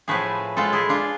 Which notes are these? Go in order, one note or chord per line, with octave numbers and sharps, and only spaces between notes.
A2 F3 A3 G#4 B4
A2 G#3 F4 A4
E4 G#4
D4 F4